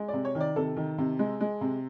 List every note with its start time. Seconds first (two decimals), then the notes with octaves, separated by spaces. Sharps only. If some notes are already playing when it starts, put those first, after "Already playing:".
Already playing: G#3
0.08 D5
0.13 C3
0.25 C#5
0.35 D#3
0.40 D5
0.56 C3 A4
0.77 D#3
0.98 C3
1.19 G#3
1.40 G#3
1.61 C3